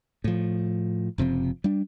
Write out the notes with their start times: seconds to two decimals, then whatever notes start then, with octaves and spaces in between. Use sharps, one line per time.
0.24 A2 F3
1.18 F#1 C3 F3 C4
1.64 G3 D4